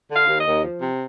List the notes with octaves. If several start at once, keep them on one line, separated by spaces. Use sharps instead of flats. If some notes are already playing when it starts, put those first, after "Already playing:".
D3
F5
D#2
D#5
D#2
F3
C3